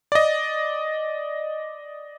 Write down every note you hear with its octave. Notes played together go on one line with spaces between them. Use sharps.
D5 D#5